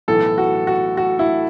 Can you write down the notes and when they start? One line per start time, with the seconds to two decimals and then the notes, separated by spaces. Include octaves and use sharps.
0.08 B1 A2 E3 A4
0.38 F#4
0.67 F#4
0.97 F#4
1.19 E4